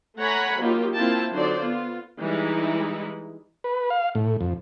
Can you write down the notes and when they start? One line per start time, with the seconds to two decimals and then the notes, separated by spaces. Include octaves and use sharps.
0.18 A3 C#5 F#5 G#5 A#5 B5
0.58 F#3 A#3 D#4 F4 G4
0.95 A#3 C4 E4 F4 G5 A5
1.32 D3 F#3 D#4 C5 D5
1.60 B3 F4
2.18 E3 G3 G#3 D#4 E4
3.64 B4
3.90 F5
4.15 A2
4.41 F2